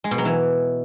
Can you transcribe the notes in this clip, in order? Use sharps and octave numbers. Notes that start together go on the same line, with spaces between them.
G#3
B2
F#3
E3